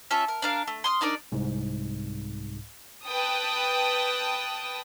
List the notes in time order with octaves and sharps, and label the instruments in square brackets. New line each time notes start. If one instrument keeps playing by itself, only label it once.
[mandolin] C#4 F4 A4 E5
A#4
D4 A#4 F5
A3
C6 D#6 F6
D4 D#4 A#4 D5
[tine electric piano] C2 G#2
[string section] B4 G5 A5 D#6